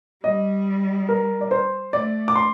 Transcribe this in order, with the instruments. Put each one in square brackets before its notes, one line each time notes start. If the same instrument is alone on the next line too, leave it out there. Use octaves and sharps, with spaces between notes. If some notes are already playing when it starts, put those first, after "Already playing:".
[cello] G3 [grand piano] D#5
[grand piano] A#4
D5
C5
[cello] A3 [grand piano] D5
[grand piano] D6
C6